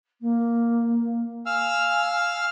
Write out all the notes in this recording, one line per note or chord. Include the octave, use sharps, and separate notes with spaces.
A#3
F5 G#5 E6 F6